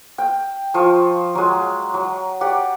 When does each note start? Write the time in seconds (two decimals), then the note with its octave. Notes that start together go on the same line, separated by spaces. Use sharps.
0.18 G5
0.74 F3 F4 C#6
1.35 F#3 G#3
1.94 F#3
2.41 G4 D5 F#5